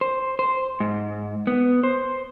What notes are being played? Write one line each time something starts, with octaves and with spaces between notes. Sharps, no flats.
C5
C5
G#2
B3
C5